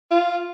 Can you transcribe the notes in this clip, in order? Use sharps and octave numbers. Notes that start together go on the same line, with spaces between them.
F4